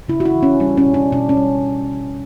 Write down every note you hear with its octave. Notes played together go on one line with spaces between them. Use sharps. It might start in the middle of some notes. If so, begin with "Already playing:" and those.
C#3 E4
F#4
E4
E3
C#4
G3 D4
C#4
B2
D4
B2 D4
C#4
G3